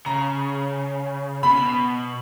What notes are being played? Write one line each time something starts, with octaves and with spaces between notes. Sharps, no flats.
C#3 A#5
B2 B5
C#3
B2